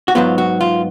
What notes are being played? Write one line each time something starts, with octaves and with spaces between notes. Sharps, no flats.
F#4
G#2 F#3 B3 F4
F#4
F4